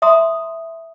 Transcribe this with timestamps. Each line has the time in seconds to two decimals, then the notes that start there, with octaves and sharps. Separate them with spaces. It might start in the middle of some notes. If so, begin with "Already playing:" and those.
0.02 E5 A#5 C6 D#6